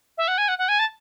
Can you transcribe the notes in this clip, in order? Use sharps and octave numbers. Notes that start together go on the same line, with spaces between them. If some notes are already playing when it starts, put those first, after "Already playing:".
E5
F#5
G#5
F#5
F#5
G#5
A5